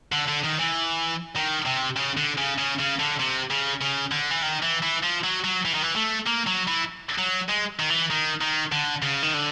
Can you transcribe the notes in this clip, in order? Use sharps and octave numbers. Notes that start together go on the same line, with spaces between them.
D3
D3
D#3
E3
D#3
C3
C#3
D3
C#3
C#3
C#3
D3
C3
C#3
C#3
D3
E3
D#3
E3
E3
F3
F#3
F#3
E3
D#3
E3
A3
A#3
F#3
E3
F#3
G#3
D#3
E3
D#3
D#3
D3
C#3
D#3
D3